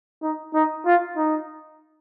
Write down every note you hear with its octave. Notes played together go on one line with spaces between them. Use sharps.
D#4
D#4
F4
D#4